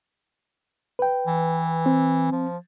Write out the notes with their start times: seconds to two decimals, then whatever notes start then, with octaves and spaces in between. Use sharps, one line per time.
0.99 B4 G5
1.27 E3
1.86 C4
2.32 F3